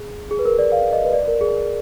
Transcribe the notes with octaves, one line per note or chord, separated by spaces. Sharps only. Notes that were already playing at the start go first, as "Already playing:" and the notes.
Already playing: G#4
G#4
B4
A#4
D5
F5
D#5
B4
D5
A#4
G#4